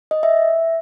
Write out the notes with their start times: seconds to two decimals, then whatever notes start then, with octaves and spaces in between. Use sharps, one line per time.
0.11 D#5
0.23 E5